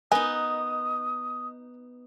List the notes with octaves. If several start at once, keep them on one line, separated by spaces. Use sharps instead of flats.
B3 D#4 A#4 D#5 G#5 D#6